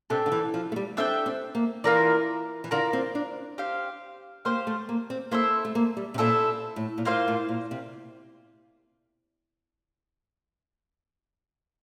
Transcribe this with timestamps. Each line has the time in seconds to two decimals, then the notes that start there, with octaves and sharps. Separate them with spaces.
0.10 C3 D4 A4 E5 G5
0.26 D3
0.32 E3
0.54 F3
0.72 A3
0.76 G3
0.97 C4 D4 A4 E5 G5
1.26 C4
1.55 A#3
1.84 E3 F4 A#4 D5
2.64 E3
2.71 D3 F4 A#4 D5
2.93 C4
3.15 D4
3.58 G4 C5 F5
4.45 A#3 G4 C5 F5
4.67 A3
4.89 A#3
5.10 C4
5.31 A#3 E4 A4 C5 E5
5.65 A3
5.75 A#3
5.97 G3
6.14 C3
6.18 A#2 E4 A4 C5 E5
6.76 A2
6.98 A#2
7.05 A2 A#3 F4 C5 F5
7.28 A2
7.49 A#2
7.71 C3